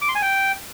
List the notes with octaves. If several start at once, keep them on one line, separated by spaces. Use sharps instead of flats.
D6
C6
G#5
G5